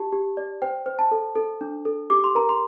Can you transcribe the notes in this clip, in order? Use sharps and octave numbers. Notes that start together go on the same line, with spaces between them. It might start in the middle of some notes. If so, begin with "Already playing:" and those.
Already playing: G4 A5
G4
D5
C5 G5
C5
A5
A4
A4
D4
A4
G4 D6
C6
A#4 A#5
C6